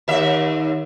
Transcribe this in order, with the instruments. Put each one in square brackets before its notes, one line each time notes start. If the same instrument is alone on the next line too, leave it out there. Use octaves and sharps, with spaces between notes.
[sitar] D#2 E5